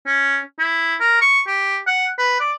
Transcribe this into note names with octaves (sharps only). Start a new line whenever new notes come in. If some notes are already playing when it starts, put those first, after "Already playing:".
C#4
E4
A#4
C#6
G4
F#5
B4
D5